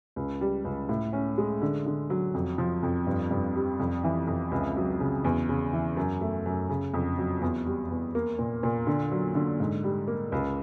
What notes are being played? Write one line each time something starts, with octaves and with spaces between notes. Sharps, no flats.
C#2
G3
C#2
A2
C#4
G#3
D3
D3
F#3
F2
F3
F2
G2
G2
G3
F2
E3
F2
C#2
F#3
C#3
E2
C#3
E3
F#2
A3
F#2
C#3
F2
F#3
E2
G3
E2
A#3
A#2
A#2
D3
F#3
D3
G#2
G3
A#3
C#2